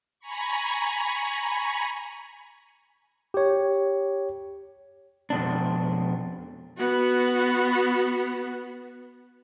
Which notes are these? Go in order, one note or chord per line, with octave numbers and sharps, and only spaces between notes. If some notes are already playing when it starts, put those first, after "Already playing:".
G#5 A#5 B5 C#6
G4 C#5
F2 B2 D4
B3 F#4